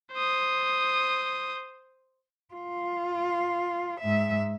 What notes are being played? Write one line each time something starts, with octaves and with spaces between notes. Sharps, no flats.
C5 D#6
F4
G#2 E5